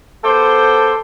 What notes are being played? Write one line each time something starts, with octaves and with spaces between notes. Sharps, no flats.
B3 G4 A4 C5